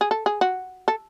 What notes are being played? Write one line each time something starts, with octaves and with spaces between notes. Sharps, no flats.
G#4
A4
G#4
F#4
A4